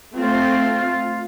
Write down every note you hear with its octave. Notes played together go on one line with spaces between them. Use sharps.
A3 C4 F4 C5